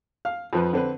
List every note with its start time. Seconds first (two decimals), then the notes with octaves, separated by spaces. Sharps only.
0.25 F5
0.53 F2 F3 B4
0.73 D3 C4 B4